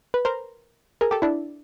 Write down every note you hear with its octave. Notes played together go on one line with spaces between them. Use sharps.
B4
A#4 C5
G#4 A#4
G4 A4
D4 E4